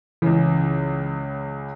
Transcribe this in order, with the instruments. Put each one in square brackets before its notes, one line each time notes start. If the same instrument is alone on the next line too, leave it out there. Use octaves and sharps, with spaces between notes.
[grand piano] C#2 C#3 [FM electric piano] E3